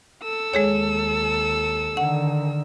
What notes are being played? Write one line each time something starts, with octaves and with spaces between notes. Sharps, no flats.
A4 E6
D#2 G#3 G#4 C#5
D3 D#3 F#5